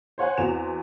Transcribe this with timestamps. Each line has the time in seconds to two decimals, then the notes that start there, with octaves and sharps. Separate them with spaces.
0.18 C5 C#5 F#5 G#5
0.37 E2 C4 F#4 E7 F7